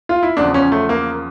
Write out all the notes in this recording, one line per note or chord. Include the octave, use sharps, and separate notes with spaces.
F4
E4
E2 C#3 F3 D4
C#4
A3
A#3